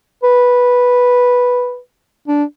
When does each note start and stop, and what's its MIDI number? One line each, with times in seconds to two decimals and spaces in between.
0.23 1.78 71
2.28 2.44 62